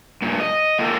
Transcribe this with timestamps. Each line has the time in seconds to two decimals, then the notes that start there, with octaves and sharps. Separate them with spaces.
0.22 G2 A#2
0.40 D#5
0.79 A#3 F4 G4 A4 A#4